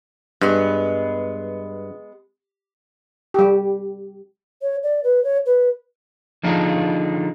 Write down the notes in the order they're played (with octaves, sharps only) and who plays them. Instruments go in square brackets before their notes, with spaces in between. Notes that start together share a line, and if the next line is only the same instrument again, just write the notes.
[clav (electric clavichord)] G2 [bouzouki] G#3 B3
[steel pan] G3 G4
[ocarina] C#5
D5
B4
C#5
B4
[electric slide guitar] D3 F3 D4 D#4 F4 G#4